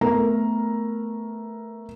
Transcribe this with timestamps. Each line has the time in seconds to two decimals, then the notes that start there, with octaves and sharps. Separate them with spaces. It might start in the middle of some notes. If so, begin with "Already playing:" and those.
0.01 A3 B3 A#4 A#5